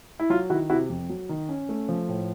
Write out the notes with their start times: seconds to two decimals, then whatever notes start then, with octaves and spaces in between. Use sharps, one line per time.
0.20 E4
0.30 F#3 F4
0.50 D#3 E4 F#4
0.70 C3 E4 F#4
0.90 F2
1.09 F#3
1.29 D#3
1.49 C#4
1.69 A3
1.89 F3
2.08 A2